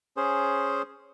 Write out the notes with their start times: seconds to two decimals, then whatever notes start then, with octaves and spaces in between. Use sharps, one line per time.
0.17 C#4 G#4 C5